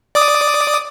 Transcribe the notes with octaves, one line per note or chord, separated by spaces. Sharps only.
D5 D6 D#6